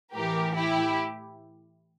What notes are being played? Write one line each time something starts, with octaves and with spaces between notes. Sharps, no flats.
A2 E3 G4 A#4
E4 G4